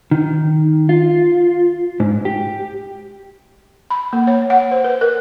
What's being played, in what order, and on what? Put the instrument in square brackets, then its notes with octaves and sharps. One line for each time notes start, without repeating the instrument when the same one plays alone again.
[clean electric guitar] D#3
F4
G#2
G4
[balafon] B5
A#3
C#5
F#5
C5
B4
A#4